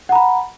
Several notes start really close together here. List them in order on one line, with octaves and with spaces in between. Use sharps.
F#5 A#5 B5